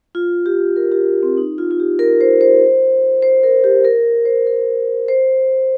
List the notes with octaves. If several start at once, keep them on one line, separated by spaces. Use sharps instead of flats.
F4
G4
A#4
G4
C4
D#4
F4
F4
G4
A#4
C5
C5
C5
A#4
G4
A#4
C5
A#4
C5